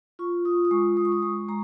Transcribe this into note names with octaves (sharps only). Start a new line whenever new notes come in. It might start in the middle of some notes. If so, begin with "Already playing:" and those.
F4 C#6
F4 D#6
D#6
G#3 C#6
G#3 D#6
C#6
D#6
G#3 C#6
G#3 A#5